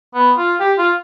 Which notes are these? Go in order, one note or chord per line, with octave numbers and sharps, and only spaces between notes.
B3
F4
G4
F4